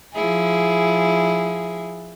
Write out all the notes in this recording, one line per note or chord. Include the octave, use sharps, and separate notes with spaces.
F3 E4 G#4